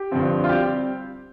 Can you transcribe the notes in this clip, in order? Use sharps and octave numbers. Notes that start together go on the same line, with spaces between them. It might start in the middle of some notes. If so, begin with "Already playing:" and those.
Already playing: G4
G2 D3 F3 C4
F4
G3 C4 G4